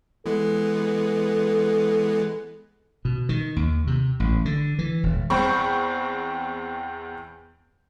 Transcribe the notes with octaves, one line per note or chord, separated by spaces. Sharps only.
E3 G#3 B3 A4
B2
D#3
D#2
C3
A1
D3
E3
D#1
E2 C4 B5 C#6